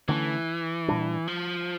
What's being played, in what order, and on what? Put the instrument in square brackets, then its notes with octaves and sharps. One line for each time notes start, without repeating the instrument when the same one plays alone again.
[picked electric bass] D3 A3 C#4 [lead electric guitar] E3
[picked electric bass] A#2 G3 D4
[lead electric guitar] F3